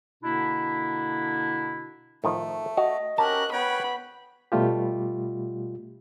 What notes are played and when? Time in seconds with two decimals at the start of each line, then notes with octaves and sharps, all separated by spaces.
0.23 B2 D3 A#3 D4 E4
2.24 A2 D#3 F3 A3
2.77 F#4 D#5
3.18 C#4 F#4 G4 A#4 A5 F#6
3.53 B3 B4 C#5 G5 B5
4.52 B2 G3 A3 F4 G4